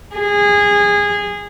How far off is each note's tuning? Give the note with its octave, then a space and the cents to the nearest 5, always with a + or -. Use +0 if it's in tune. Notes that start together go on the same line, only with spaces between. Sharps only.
G#4 -20